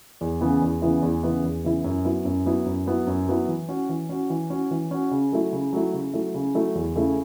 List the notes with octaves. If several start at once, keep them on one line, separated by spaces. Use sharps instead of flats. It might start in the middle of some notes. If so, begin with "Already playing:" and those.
E2
C#3 E3 B3 E4
E2
C#3 E3 B3 E4
E2
C#3 E3 B3 E4
E2
C#3 E3 B3 E4
F#2
F#3 B3 E4
F#2
F#3 B3 E4
F#2
F#3 B3 E4
F#2
F#3 B3 E4
E3
C#4 F#4
E3
C#4 F#4
E3
C#4 F#4
E3
C#4 F#4
C#3
F#3 A3 E4
C#3
F#3 A3 E4
C#3
F#3 A3 E4
C#3
F#3 A3 E4
E2
C#3 A3 E4